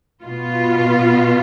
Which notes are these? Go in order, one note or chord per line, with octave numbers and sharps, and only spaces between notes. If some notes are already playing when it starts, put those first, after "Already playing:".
B2 B3 F4